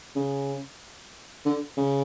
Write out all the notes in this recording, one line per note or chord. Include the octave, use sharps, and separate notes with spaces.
C#3
D3
C#3